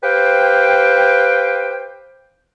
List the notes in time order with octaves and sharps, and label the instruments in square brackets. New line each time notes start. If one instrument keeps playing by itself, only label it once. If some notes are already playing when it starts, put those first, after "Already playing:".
[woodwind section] G4 B4 C5 F5 G5